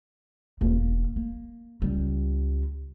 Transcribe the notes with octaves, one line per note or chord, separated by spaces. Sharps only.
E1 A#3
A#3
C#2 G3